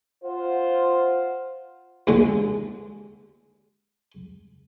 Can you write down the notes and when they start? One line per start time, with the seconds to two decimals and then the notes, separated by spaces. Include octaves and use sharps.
0.24 F4 C5 F#5
2.07 D#2 D3 G#3